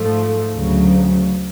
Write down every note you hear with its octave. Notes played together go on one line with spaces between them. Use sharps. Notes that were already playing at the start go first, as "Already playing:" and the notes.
Already playing: G#2 F3 A3
D2 C#3 F#3